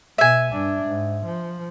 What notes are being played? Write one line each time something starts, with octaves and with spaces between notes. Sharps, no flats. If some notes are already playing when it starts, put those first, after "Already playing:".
B2 E5 G#5
G2 D4
G#2
F3